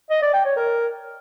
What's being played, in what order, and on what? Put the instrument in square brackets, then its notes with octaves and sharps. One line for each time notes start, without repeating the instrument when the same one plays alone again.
[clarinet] D#5
D5
G5
C#5
A#4